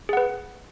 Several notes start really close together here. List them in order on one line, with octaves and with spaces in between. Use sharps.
G#4 F#5 B4